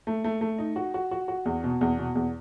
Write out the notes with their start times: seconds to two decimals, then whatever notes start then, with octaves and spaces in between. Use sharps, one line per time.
0.07 A3
0.24 A3
0.41 A3
0.58 D#4
0.76 F#4
0.94 F#4
1.11 F#4
1.28 F#4
1.45 E2
1.64 B2
1.81 E2
1.98 B2
2.15 E2